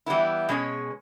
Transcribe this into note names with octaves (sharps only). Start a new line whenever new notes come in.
E3 G3 B3 E4
B2 G#3 C#4 G#4 C#5